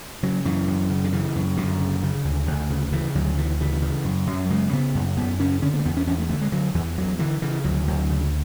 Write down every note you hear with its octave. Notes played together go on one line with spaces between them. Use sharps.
C#3 F#3
F#2 E3
F#2
C#3
D3
C#3 E3
F#2
F#2 D3
C#3
C#3
D2
D2
C#3
C#3 E3
D2 F#3
D2 E3
C#3 E3
C#3
F#2
F#2 F#3
C#3 G#3
C#3 B3
F#2
F#2 B3
C#3 C#4
D3 C#4
B3
A3
E2 B3
C#4
E2 C#4
A3
D3 A3
G#3
D3 F#3
E2 E3
E2 F#3
D3 E3
C#3 E3
D2 F#3
D2 F#3
C#3